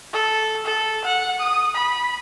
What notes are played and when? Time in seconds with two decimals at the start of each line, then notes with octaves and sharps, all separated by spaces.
0.13 A4
0.65 A4
1.04 F#5
1.40 D#6
1.75 B5